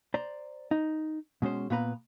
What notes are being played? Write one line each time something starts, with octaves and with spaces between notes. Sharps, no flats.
C5 D5 A#5
D#4
B2 G#3 C#4 C5
A#2 B3 B4 A#5